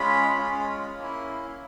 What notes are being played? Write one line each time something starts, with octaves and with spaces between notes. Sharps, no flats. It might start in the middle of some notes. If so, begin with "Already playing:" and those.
Already playing: G#3 C#4 F4 B5
G#3 C#4 F4
A#3 C#4 E4